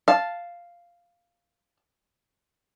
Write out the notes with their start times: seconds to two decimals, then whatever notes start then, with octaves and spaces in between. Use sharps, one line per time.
0.08 F5 A5